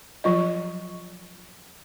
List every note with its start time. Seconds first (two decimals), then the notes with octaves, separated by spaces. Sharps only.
0.24 F3 F#3 F4 D#5